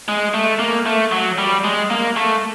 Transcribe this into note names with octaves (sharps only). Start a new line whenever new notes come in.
G#3
A3
A#3
A3
F#3
G3
G#3
A#3
A3